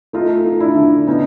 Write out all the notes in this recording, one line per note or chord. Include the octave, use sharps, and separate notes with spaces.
A3 D#4 F4
A3
D4 E4
D3
B3 C#4 D#4